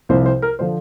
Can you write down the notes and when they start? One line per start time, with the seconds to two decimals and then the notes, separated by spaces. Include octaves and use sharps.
0.09 C2 C3 F3 C5
0.26 C5
0.42 A#4
0.59 D3 F3 C5